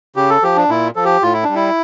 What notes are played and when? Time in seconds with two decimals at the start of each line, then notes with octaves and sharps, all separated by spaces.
0.16 C#3 G4
0.30 A4
0.43 F3 G4
0.56 D4
0.69 A#2 E4
0.96 F3 A4
1.05 G4
1.23 A2 F4
1.33 E4
1.44 D4
1.49 G3
1.55 E4